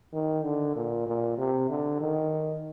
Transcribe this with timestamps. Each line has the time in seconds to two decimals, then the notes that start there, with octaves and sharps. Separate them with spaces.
0.13 D#3
0.44 D3
0.76 A#2
1.07 A#2
1.37 C3
1.69 D3
2.00 D#3